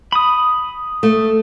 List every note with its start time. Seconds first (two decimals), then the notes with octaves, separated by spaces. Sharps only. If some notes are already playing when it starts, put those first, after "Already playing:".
0.12 B5 D#6
1.03 A3